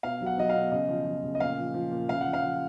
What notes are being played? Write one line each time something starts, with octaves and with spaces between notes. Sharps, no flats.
B2 F5
F#3
F#5
F#3 D#5
F5
B2
C#3 D#5
F3
F3
C#3
D#5
A#2 F5
F3
F3
A#2
C#3 F5
F#5
F3
F5
F3